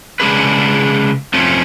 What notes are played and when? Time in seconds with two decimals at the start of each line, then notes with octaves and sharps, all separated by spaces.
0.20 C#3 G#3 D4 G#4 B4
1.34 F2 F3 A3 C#4